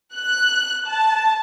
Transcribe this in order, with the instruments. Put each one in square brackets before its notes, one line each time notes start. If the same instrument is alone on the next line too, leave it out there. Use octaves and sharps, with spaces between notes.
[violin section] F#6
A5